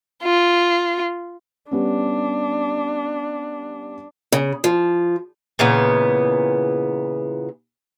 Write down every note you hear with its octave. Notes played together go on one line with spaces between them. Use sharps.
F4
G3 B3 C#4 D4
C#3
F3
A#2 C#3 E3 B3